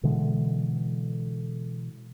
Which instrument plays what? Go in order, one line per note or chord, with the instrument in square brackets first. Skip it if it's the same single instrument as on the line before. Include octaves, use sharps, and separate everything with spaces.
[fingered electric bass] B2 D3 E3 G#3